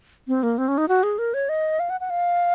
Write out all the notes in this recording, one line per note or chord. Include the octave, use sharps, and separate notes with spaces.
C4
A#3
C4
C#4
D#4
F#4
G#4
A#4
C#5
D#5
F5
F#5
F#5
F5